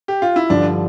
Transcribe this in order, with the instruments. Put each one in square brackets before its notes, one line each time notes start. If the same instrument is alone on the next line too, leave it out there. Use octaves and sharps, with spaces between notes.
[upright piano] G4
F4
E4
[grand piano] G2 D3 F3 [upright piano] D4